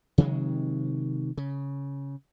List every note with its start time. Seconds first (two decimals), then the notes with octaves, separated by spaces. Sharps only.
0.18 C3 D#3 F#3 G#3
1.37 C#3